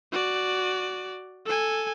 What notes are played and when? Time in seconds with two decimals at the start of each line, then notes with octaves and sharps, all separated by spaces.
0.12 F#4 D5
1.46 A4 G#5